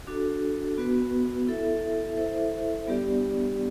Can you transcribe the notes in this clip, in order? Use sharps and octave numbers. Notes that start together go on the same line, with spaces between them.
D4 F#4 A4
B3 F#4 B4
E4 A4 E5
E4 A4 C5 E5
G3 B3 D4 G4 D5